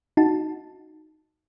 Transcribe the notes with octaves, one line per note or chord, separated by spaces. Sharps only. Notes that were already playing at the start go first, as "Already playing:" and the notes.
D#4 F#4 A5